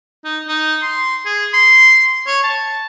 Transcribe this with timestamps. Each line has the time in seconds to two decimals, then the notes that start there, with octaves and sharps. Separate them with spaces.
0.25 D#4
0.48 D#4
0.82 C6
1.26 G#4
1.53 C6
2.27 C#5
2.44 A5